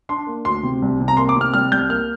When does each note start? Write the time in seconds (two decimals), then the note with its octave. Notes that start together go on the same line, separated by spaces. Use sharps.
0.09 D4 C6
0.27 A#3
0.45 D2 C6
0.63 C3
0.82 C2
1.00 C3
1.08 A#5
1.17 A#3 C6
1.29 D6
1.36 C3 F6
1.54 G3 F6
1.72 C2 G6
1.89 A#3 F6